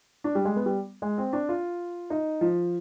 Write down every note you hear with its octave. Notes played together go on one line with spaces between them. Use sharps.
D4
G3
G#3
B3
G3
G#3
C4
D4
F4
D#4
F3